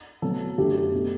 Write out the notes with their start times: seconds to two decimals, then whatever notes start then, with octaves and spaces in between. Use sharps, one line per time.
0.22 B2 F#3 A3 A4
0.58 F#2 D3 F#3 A3 G4
0.93 B2 A3